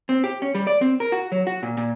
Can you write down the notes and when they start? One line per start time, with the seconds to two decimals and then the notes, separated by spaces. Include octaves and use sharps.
0.09 C4
0.24 G4
0.42 C#4
0.55 G3
0.67 D5
0.81 C4
1.00 A#4
1.12 F#4
1.32 F#3
1.47 F#4
1.63 A#2
1.77 A#2